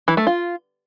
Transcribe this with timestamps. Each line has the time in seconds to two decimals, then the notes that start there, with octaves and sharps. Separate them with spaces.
0.08 E3
0.17 A3
0.27 F4